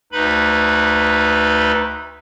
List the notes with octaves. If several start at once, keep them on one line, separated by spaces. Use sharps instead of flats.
D2 D#4 B4 B5